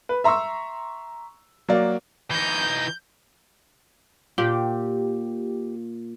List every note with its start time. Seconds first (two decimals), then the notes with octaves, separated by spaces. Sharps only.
0.09 B4
0.24 E5 A#5 C6 C#6 E6
1.69 F#3 A#3 D5
2.31 E3 D#4 G6
4.38 A#2 G4